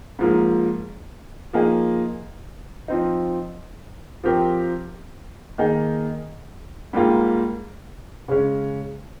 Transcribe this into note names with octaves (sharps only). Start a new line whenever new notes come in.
G#2 F3 A#3
F3 A#3 D#4 G#4
F3 C4 D#4
F3 C4 G4 A#4
D#3 A#3 D#4 G#4
G#2 G3 A#3 F4
C#3 G#3 C#4